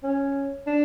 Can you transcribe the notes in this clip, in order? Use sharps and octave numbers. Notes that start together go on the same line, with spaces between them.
C#4
D4